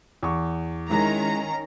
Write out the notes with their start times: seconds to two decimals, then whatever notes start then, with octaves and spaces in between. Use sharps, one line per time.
0.23 E2 C#6
0.90 D#3 G#3 C#4 E4 A#5